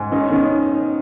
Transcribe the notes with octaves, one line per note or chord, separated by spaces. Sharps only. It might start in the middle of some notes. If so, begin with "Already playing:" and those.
Already playing: G#2
D#3 D#4
C#4
D#3 B3
C#4